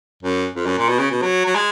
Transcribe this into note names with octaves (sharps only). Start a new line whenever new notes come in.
F#2
F2
F#2
A#2
B2
C#3
B2
F#3
F#3
G#3